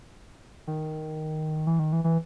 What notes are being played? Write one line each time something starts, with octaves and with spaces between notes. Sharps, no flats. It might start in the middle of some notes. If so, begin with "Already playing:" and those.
D#3
E3
D#3
E3
E3